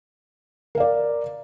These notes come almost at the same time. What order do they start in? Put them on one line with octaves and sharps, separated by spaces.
A#4 F5 D5